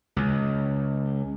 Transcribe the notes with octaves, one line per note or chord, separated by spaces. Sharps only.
C#2